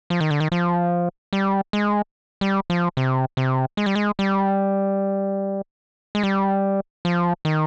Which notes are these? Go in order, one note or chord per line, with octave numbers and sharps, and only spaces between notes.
F3
D#3
D3
D#3
F3
G3
G#3
G3
F3
C3
C3
G#3
G3
G#3
G3
G#3
G3
F3
D#3